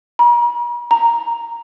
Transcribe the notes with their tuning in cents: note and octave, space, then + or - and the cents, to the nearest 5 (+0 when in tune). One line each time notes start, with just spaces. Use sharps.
A#5 +45
A#5 -5